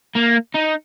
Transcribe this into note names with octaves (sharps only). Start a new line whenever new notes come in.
A#3
D#4